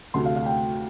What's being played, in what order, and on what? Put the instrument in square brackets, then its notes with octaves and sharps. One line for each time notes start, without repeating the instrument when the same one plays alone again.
[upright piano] D2 C3 A3 C6
F5
F5
G5